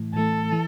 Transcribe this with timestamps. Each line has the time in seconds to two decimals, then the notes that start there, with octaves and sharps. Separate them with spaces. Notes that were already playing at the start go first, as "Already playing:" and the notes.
Already playing: A2 E3 A3
0.14 A2 E3 A3 A4
0.52 E3